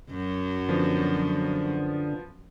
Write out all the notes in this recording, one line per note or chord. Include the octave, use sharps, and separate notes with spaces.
F#2 F#3
D3 F3 B3